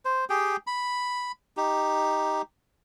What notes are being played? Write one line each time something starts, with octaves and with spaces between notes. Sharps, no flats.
C5
G4 G#4 G5
B5
D#4 G4